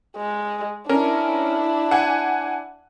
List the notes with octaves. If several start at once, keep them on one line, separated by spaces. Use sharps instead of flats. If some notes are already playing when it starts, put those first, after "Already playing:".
G#3
C#4 D4 E4 A#4
F#5 G#5